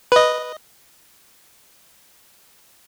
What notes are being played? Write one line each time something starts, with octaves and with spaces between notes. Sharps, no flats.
B4 D#5